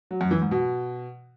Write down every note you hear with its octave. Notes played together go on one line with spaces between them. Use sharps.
F#3
F#2
E3
G#2
B2